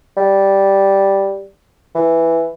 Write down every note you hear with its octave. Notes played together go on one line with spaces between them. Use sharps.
G3
E3